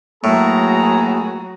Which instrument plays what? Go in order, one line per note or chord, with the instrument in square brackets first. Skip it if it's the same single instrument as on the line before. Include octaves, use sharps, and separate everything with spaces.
[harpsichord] A2 [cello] F#3 F#4 [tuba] A#3 [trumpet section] B3 G#4 A#5